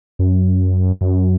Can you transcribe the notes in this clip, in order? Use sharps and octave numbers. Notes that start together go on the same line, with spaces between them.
F#2
F#2